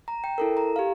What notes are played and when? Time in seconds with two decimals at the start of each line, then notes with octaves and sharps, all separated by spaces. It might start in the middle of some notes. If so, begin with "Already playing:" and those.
0.08 A#5
0.24 G5
0.38 E4 A4 A#4
0.57 A#5
0.76 G4 F5